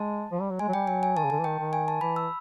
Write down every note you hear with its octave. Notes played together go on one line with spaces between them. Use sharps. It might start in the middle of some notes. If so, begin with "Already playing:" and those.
Already playing: G#3 A5
F3
G3
F#3
G#3 G#5
F#3
G3 G5
F#3 G#5
G#5
D#3 A5
C#3
D3 A5
E3
D#3 G5
D#3
G#5
A5
E3 B5
E6